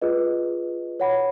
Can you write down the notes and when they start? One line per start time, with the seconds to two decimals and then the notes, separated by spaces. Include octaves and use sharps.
0.02 F4 G#4 B4 D#5
1.00 C#5 F#5 B5